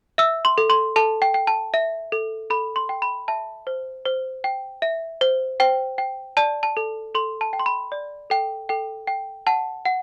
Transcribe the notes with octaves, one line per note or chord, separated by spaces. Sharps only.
E5 E6
C6
A4
C6
A4 A5
G5
G5
A5
E5
A4
A4 B5
C6
G5
B5
E5 A5
C5
C5
G5
E5
C5
C5 G5
G5
D5 A5
A5
A4
A4 C6
A5
G5
C6
B5
D5
A4 G5
A4 G5
G5
F#5 A5
F#5